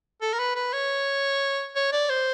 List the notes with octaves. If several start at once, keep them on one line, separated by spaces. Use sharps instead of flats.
A4
A#4
B4
B4
C#5
C#5
D5
C5